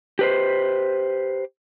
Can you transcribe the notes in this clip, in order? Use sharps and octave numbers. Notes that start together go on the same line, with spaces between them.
G4 B4 C5